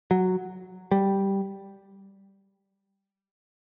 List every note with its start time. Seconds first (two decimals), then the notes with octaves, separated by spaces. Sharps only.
0.11 F#3
0.91 G3